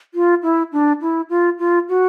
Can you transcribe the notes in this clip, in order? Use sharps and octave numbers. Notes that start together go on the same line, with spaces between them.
F4
E4
D4
E4
F4
F4
F#4